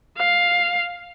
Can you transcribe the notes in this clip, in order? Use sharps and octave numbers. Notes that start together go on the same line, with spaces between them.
F5